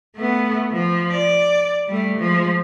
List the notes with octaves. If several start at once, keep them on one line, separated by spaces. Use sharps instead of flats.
A3 B3
F3
D5
G3 A3
F3 G#3